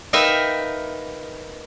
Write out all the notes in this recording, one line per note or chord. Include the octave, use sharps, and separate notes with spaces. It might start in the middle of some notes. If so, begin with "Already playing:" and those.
D#4 A#4 B4 E5 F5 G5